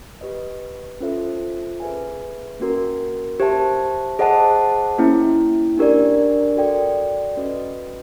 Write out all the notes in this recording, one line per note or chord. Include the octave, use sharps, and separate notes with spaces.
G4 B4 D#5
C#4 F4 A4 C5 E5
G#4 B4 E5 G#5
A#3 C#4 F#4 A#4
G4 C5 E5 A5
G#4 C5 D#5 F#5 A5
A#3 C#4 E4
D4 G4 A#4 D5
F#4 A4 D5 G5
C#4 F#4 B4 D#5